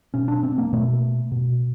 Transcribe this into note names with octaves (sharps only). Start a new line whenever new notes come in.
B2 C#4
D4
C4
A#3
B2 A3
B2